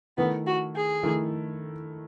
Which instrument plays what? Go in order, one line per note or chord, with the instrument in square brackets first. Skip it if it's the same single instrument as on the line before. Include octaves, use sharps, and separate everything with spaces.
[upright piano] D#3 A3 E4 [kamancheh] B3
[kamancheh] F#4
G#4
[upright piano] D#3 A3 E4